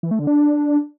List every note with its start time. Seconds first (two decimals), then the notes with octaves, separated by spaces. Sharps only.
0.03 E3
0.11 A3
0.19 D3
0.27 D4